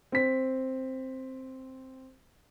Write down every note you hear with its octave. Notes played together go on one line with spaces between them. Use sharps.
C4 B6